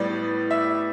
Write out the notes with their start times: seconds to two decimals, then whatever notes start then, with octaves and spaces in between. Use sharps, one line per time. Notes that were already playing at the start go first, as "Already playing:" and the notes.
Already playing: A2 G3 B3 D5
0.51 E5